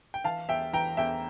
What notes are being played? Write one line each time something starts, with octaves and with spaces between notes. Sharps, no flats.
G5
E3 F5 A5
E2 E5 G5
E3 G5 A#5
E2 E5 G5